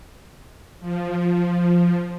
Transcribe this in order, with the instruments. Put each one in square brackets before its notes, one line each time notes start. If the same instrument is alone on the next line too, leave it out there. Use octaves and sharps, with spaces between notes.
[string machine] F3